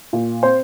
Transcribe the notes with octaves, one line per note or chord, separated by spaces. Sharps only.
A#2
C4 C5